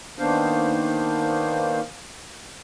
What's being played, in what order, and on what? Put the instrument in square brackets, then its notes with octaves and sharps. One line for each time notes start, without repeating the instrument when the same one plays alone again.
[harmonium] D#3 A#3 B3 D4 C5 F5